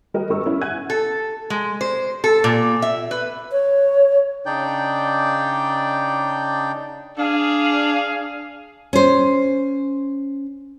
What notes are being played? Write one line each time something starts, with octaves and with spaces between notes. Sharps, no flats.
G3 F#4 A#4 D#5
G2 G3 B3 A#4 C#6 E6
C#4 E4
F#5 G#5 F#6 G#6 D#7
A4
G#3
C5
A4
A#2
E5
B4
C#5
C#3 D4 D#4 D5 G5 G6
D4 G#4 F5
C#4 C5